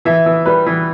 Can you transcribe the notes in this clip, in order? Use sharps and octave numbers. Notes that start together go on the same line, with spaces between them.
E3 E5
E3
G3 B4
E3